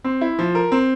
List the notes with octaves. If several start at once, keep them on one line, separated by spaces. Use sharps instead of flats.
C4
E4
F3
A#4
C4